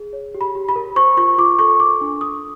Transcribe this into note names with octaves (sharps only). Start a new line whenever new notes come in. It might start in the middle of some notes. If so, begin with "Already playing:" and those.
Already playing: G#4
C#5
G4
B5
G4
B5
A#4
C5 C#6
F4 C#6
F4 D6
A4 C#6
A4 D6
D4
D4 D#6